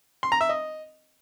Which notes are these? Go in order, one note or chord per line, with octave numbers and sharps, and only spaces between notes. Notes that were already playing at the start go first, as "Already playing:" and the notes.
C6
A#5
E5
D#5